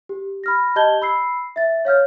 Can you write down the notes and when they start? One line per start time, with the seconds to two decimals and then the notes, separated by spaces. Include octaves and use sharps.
0.09 G4
0.44 B5 F6 A#6
0.76 G4 D#5 A5 G6 G#6 G7
1.02 B5 E6 C7
1.56 E5 A6
1.85 C#5 F5 F6 G6